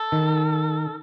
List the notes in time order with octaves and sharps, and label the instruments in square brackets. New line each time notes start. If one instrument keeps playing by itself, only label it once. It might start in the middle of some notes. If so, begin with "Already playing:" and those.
Already playing: [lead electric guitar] A4
[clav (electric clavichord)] D#3